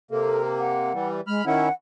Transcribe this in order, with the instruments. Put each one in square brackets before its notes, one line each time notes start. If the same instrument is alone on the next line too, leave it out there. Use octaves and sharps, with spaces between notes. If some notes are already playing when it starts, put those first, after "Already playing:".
[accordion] C3 A#3 [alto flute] A4
[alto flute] F#5
[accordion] E3 G3
[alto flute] G#3 [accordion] B5 F6
[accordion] D#3 C#4 E4 [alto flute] F#5